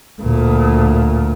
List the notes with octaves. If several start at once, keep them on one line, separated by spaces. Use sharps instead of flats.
D2 A#2